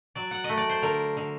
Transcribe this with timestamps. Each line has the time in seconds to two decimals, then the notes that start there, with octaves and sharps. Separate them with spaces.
0.15 F#3 D5
0.31 F#5
0.44 A3 D#5
0.57 D5
0.69 C5
0.83 D3 A#4
1.17 D3